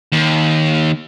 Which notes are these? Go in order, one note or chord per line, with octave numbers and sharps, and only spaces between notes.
D#2